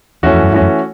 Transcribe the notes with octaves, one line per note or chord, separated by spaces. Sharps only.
E2 E3 A3 C#4 F#4
F2
F#2
G2 E3 A3 C#4 F#4
F#2